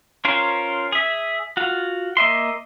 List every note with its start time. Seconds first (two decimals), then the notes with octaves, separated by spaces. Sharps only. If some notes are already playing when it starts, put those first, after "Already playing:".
0.25 C#4 F4 A#4 C5
0.92 G#4 E5
1.57 F4 F#4
2.17 A#3 D#5 E5 C6